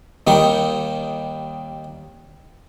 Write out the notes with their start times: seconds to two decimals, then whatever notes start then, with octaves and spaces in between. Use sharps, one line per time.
0.27 D#2 D#3 G3 D#4 C#6